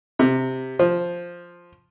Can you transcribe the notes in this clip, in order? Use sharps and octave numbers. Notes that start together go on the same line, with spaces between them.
C3
F3